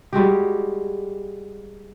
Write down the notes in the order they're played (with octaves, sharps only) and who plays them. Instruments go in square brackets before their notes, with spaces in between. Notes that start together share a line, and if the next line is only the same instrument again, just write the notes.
[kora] G3 G#3 F#4 G4